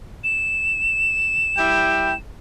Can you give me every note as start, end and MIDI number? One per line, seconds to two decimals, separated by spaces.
0.24 2.17 100
1.57 2.13 55
1.57 2.13 64
1.57 2.13 79